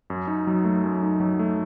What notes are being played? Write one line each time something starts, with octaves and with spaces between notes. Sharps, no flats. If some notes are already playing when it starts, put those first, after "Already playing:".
F#2
D#4
F#3
A3
F#2
D#4
F#3
A3